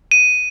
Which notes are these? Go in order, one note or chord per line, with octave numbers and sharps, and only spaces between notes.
D#7